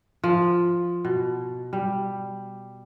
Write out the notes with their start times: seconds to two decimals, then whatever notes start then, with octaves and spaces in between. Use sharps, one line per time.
0.24 F3
1.05 B2
1.73 G3